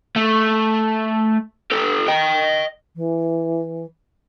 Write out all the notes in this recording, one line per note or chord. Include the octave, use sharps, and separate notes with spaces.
A3
G4 A4
D#5 G5
E3